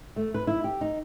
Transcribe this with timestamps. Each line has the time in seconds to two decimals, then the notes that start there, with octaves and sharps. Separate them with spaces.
0.16 A3
0.34 B4
0.47 E4
0.64 G4
0.81 D#4